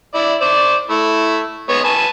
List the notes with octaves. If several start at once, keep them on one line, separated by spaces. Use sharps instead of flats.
E4 D5
C5 D5 D6
A3 E4
G#3 B3 C#5
B4 G#5 A5